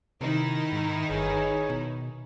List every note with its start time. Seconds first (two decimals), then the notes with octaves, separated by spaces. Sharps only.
0.21 C3 D#3 D#4 E4
0.72 G#2
1.10 G1 G#4 B4 C#5
1.69 B2